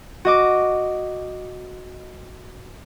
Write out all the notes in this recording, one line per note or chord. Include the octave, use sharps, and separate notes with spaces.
F#4 D#5 D6